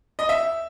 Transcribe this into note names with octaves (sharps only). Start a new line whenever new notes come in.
D#5
E5